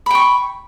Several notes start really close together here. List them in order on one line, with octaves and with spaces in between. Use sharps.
B5 G5 C#6